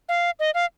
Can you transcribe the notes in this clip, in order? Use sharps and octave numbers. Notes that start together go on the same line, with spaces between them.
F5
D#5
F5